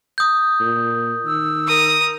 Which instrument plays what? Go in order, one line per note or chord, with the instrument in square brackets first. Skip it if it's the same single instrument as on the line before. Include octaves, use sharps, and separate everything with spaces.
[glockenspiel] D#6 G6
[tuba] A#2
[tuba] D#3 [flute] E6
[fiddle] A#4 D#6